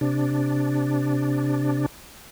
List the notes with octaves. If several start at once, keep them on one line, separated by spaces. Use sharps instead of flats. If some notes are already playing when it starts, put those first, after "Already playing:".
C3 D4